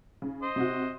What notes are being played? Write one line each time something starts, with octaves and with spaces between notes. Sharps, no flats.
C#3
C5 D#5
C3 F#4